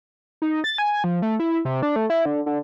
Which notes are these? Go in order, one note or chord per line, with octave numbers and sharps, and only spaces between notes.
D#4
A6
G#5
F3
A3
E4
C3
D4
A3
E4
D3
D3